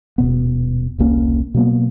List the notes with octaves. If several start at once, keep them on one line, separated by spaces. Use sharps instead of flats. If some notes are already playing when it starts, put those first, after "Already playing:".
D#1 B2 B3
E1 C2 A#3 C#4
B2 F#3 A#3 B3